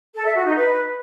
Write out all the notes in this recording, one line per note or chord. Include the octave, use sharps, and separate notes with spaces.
A4
E5
F#4
D#4
B4